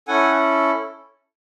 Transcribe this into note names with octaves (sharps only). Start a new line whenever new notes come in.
C#4 E4 A4 F#5 G#5